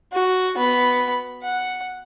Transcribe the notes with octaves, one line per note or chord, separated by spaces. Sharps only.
F#4
B3 B5
F#5